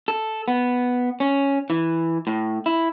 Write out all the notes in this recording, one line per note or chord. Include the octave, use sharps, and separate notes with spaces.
A4
B3
C#4
E3
A2
E4